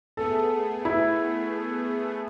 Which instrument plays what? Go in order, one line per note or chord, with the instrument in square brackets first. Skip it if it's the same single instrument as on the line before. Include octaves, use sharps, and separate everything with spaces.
[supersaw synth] A3 B3 G#4 [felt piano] A4
[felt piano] E4